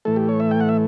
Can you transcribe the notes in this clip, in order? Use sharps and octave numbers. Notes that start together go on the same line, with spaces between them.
A2 E3 A3 A4
G4
C#5
E5
G5
F#5
E5